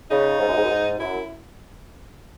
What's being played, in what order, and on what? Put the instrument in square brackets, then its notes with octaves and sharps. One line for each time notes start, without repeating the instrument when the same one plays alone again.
[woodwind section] C#3 [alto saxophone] D#4
[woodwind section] G#2
F#2
G#2
F#2
G#2
[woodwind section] F#2 [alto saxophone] E4